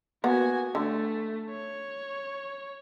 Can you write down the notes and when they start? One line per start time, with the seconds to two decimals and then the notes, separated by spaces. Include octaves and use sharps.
0.24 A#3 B3 F#4 G#5
0.75 D3 A3
1.50 C#5